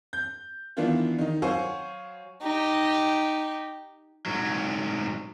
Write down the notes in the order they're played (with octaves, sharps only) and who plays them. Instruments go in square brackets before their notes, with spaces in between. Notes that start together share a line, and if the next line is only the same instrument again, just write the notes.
[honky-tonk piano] G6
D#3 E3 B3 D4 E4 F4
D#3 D#4
F#3 C5 F5 F#5 G#5 C#6
[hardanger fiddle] D#4 G4
[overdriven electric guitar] G#2 F#3